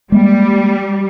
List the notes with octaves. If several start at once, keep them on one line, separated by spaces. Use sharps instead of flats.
G3 G#3 A#3